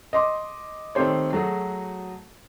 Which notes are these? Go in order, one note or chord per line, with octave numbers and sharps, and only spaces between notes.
D#5 C6 D6
D#3 A3 C4 G4 C5 C#5
F#3 A3 F#4 G#4